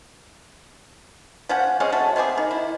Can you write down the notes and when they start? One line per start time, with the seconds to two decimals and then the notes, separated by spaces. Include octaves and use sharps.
1.49 F3 C#4 F#5
1.80 G#3 C4 C#4 G#4
1.92 A3 F#4 A4
2.16 B3 C4 G4 G#4
2.38 D#3
2.51 E4